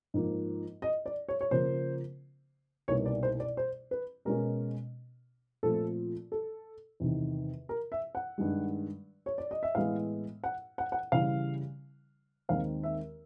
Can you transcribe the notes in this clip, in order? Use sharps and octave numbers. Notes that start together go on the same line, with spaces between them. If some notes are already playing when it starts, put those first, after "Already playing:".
G#2 F3 A#3
D#5
D5
C#5
C#5
C#3 F3 A#3 C5
C2 B2 G3 A#3 D#4 C#5
D5
C5
D5
C5
B4
B2 G#3 C#4 A#4
A#2 F3 A3 C4 A4
A4
E2 C3 D#3
A#4
E5
F#5
G2 D#3 G#3
C#5
D5
D#5
E5
A2 E3 G#3 B3 F5
F#5
F#5
F#5
C#3 E3 G3 F5
D#2 D#3 G#3 C4 D#4 F5
E5